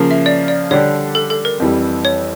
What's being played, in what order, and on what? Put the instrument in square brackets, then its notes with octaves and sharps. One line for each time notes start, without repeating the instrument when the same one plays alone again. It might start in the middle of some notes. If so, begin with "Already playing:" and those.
Already playing: [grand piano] C#3 F3 A#3
[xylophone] E5
D5
D5
[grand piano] D3 G3 D4 G4 [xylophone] C#5
[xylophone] A4
A4
A#4
[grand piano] F2 E3 G3
[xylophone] C#5